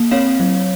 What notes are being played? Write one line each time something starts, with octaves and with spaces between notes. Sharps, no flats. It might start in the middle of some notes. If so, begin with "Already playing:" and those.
Already playing: A#3
C4 C#5 F5
F#3